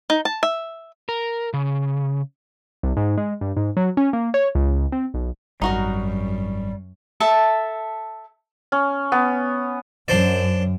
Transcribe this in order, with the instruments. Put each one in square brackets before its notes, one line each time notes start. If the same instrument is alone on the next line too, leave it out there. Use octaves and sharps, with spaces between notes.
[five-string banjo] D#4
A5
E5
[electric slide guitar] A#4
C#3
[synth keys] C2
G#2
G#3
G2
G#2
F#3
C#4
A#3
C#5
C#2
C4
B1
[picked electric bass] G#1 [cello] F#2 [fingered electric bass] G3 [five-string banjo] D#4 F#4 A#4
[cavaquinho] A4 E5 A5
[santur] C#4
B3
[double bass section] F#2 [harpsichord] D4 C5 D5